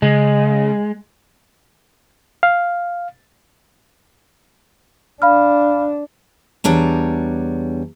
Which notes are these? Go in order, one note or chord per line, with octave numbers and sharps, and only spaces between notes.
C#3 G#3
F5
D4 F5 B5 F6
E2 G3 D4 C#5 A#5